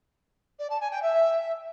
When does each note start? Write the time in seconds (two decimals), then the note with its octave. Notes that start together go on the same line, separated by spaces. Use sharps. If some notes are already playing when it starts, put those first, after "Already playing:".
0.59 D5
0.70 A5
0.81 G#5
0.91 G5
1.02 E5